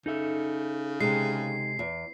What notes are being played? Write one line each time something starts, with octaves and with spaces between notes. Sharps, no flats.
C#3 D#4 A4 E5
C3 G#3 C7
E2